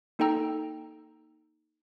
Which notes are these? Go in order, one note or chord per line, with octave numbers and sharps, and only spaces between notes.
A#3 D#4 A4 G5 A#5 E6